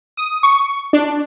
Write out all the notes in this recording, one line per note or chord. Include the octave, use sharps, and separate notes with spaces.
D#6
C#6
D4